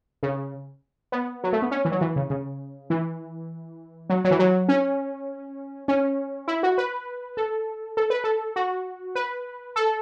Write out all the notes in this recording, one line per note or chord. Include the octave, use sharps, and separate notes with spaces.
C#3
B3
F#3
A3
B3
C#4
E3
F#3
E3
C#3
C#3
E3
F#3
F#3
E3
F#3
C#4
C#4
E4
F#4
B4
A4
A4
B4
A4
F#4
B4
A4